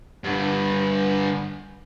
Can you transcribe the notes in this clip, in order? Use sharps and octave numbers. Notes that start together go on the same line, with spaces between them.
G2 D3